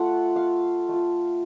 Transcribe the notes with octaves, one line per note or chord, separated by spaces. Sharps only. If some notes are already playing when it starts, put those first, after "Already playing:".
Already playing: A3 F4 F#5
F5
A3 F4